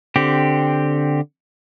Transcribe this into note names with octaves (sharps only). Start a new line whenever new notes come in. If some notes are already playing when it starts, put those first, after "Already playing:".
D3 C4 G4